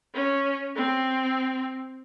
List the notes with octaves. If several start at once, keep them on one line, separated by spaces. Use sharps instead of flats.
C#4
C4